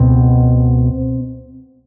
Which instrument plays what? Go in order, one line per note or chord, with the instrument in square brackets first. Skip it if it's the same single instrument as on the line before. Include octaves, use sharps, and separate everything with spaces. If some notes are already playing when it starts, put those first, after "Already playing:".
Already playing: [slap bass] C#2 B2 C4